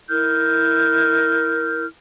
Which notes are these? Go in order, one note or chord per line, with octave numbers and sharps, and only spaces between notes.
E4 A#4 F6 G6